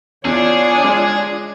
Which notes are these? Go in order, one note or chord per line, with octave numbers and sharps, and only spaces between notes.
E2 D4 F4 G#4 C#5 G#5
G#3